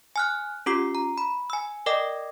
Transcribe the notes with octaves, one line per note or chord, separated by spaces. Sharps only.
G#5 F6 F#6
C#4 F4 G4 D6 C7
A#5
B5
G#5 E6
A#4 D5 D#5 G5 D6 A#6